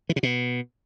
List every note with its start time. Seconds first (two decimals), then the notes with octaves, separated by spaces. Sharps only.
0.09 E3
0.16 C3
0.23 B2